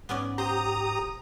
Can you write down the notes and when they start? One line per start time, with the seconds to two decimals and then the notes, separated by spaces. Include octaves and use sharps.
0.09 G#2 B3 C#4 D5
0.38 G4 C5 A#5 D#6
1.00 D#1